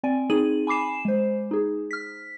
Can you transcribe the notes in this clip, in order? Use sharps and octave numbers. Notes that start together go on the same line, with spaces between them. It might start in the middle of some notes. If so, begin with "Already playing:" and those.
C4 D5 G#5
C4 D#4 G#4 D#7 F#7
G#5 B5 D6 C7 E7
G#3 C5
D#4 G#4
F6 B6